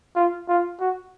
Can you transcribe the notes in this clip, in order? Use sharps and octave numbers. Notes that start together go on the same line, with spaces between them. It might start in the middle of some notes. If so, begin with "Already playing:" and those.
F4
F4
F#4